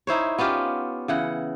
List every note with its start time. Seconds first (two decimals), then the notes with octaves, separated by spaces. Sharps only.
0.07 D#4 E4 C5 C#5
0.38 B3 C#4 F4 G4
1.08 C#3 E3 F#5